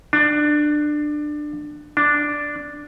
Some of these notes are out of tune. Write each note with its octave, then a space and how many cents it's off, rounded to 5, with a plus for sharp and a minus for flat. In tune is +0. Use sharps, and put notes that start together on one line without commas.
D4 +20
D4 +0